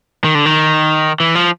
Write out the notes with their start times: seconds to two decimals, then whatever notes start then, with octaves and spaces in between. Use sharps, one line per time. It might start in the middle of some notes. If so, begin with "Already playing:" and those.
0.24 D#3
0.35 D3
0.46 D#3
1.20 E3
1.35 F3